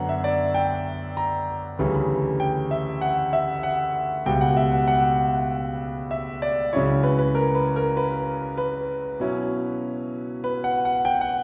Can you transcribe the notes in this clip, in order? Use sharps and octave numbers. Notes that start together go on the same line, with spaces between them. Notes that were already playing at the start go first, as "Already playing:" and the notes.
Already playing: F#2 D3 B3 D4 C#5 F#5 A#5
E5
D5
G5
A#5
D2 C#3 E3 G3
G5
E5
F#5
E5
F#5
C#2 B2 G3 G5
F#5
E5
F#5
F#5
E5
D5
C#2 C#3 F#3 C#4 E4 C#5
B4
B4
A#4
B4
A#4
B4
B4
B2 F#3 C#4 E4
B4
F#5
F#5
G5
F#5